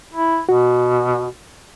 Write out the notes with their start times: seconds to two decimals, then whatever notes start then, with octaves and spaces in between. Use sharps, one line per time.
0.13 E4
0.49 B2 F#4